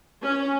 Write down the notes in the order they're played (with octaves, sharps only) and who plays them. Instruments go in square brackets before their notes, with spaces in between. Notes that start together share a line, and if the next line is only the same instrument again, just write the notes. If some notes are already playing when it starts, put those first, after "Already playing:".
[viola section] C#4